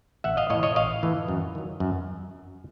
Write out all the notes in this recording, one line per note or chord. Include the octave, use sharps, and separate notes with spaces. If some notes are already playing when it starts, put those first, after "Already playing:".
A1 E5 F#5
D#5 F5
A2 E3 C#5 D#5
C#5 D#5
A1 D#5 F5
A2 E3
F#2
D#3 F#3
F#2